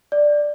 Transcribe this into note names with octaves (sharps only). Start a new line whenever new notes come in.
D5